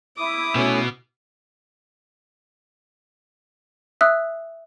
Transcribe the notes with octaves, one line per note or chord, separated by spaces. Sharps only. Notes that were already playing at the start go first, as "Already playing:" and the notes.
E4 D6 D#6
B2 A3 B3 C#4
E5 D#6 E6 F#6